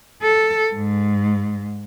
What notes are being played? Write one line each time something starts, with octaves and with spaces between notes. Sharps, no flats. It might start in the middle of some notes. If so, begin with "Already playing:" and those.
A4
G#2